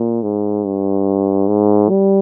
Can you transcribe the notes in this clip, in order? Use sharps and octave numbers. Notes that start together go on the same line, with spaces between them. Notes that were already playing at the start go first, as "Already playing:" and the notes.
Already playing: A#2
G#2
G2
G#2
G3